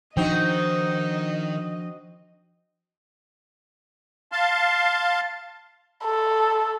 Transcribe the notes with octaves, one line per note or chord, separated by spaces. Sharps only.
D#3 F3 C4 D4 D#4 F#4 D#5
F5 A5 C6
A4